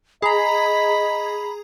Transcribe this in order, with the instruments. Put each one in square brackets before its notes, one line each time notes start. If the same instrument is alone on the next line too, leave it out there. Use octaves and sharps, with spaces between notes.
[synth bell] G#4 A#5 [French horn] D#5 [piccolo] B5